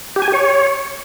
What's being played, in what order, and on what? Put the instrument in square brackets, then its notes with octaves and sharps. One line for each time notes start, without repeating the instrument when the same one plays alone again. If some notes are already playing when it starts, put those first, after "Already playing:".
[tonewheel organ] G4
G#5
G4
C#5